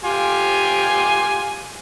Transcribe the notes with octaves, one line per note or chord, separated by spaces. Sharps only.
F4 G4 G#5